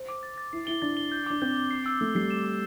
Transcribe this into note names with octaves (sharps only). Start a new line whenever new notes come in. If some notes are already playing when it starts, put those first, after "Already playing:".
Already playing: C5
D6
A6
A6
E4 C7
E4 G7
D4 A6
G7
G6
D4 D6
C4 G6
G6
C7
E6
A3 E6
G3 C7
E7
D6